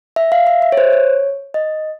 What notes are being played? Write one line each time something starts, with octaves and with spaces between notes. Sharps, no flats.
E5
F5
E5
E5
C#5
C5
C#5
D#5